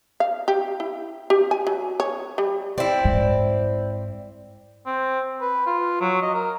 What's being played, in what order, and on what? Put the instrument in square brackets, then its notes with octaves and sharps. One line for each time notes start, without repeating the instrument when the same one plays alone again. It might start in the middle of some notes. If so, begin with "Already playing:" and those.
[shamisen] F5
G4
E4
G4
G#5
F#3
C#5
G3
[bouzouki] C4 E4 [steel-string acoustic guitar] D5
[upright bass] G#2
[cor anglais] C4
B4
F4
F#3
D#5
A#4